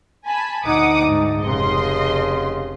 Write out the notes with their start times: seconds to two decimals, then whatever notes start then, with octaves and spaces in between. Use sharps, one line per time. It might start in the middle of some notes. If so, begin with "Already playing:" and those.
0.25 G#5 A5 B5
0.65 D2 D#4 F#5 D6 D#6
1.06 G#2
1.44 F1 C#3 D#5 C6